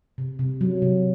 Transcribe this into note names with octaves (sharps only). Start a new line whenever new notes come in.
C3
C3
F#3
C3